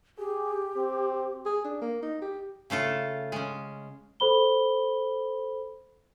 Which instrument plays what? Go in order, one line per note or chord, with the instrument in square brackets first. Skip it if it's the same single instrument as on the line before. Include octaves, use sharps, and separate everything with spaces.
[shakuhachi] G4 [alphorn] G#4
[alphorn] C4
[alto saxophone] G#4
D4
A#3
D#4
G4
[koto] C#3 A3 F4 A4
G#3 C#4
[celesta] A4 C5 B5 G7